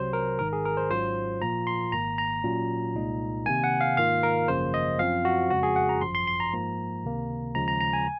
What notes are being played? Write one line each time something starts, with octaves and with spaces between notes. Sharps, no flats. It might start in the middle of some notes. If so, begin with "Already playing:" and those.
Already playing: C2 C3 F#3 C5
A#4
G#1 G#2 D#3 A#4
G#4
A#4
C5
G#1 G#2 F#3 C#4 F4 C5
A#2 F3 A#3 F4 A#5
C6
G#1 G#2 D#3 A#3 A#5
A#5
A#2 F#3 C#4 F4
C2 A#2 G#3 D#4
C3 D#3 A#3 G#5
F#5
F5
G#2 D#3 A#3 F4 F5
A#4
G#1 F#2 C#3 F3 A#3 C5
D#5
F#2 F3 C4 F4 F5
F#4
F2 C#3 G#3 C#4 F#4
G#4
F#5
A#5
G#1 F#2 F3 C6
C6
C6
A#5
G#2 F3 A#3
C#2 C3 D#3 A#3
D#2 C#3 F3 G#3 A#5
A#5
A#5
G#5